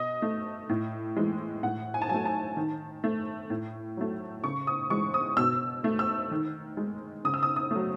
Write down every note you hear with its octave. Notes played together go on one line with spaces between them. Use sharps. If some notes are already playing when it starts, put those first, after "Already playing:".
Already playing: B2 D#5
A3
A2
E3 G#3
A2 F#5
G#5
A5
F#3 A3 G#5
A5
D#3
A3
A2
F#3 A3
C#3 C#6
D#6
E3 G#3 C#6
D#6
B2 E6
A3
E6
D#3
G#3
C#3 D#6
E6
D#6
D#6
F#3 A3